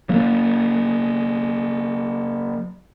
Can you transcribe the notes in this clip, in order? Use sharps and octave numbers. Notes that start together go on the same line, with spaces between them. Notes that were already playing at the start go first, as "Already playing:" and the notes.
F#3 A#3